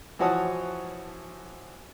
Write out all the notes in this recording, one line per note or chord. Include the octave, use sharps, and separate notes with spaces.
E3 F3 F#4 C#5 A5 D#6